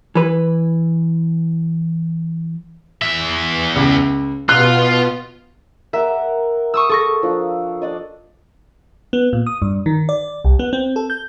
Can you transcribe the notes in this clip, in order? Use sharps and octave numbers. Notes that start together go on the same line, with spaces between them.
E3 B4
E2 E5
C#2
B2 B3 F4 F#6
A#4 E5 F#5 D6
C#6 D#6 E6
A4 C#6 A#6
F3 D4
D4 D5 D#5
B3
A#2
D#6
G2
D#3
D5
C2
B3
C4
A4
G6